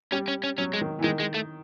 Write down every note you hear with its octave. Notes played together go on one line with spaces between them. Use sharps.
G3 C#4
C#4
C#4
F#3 C#4
G#3
D#3
E3
D#3 G#3
G#3
A3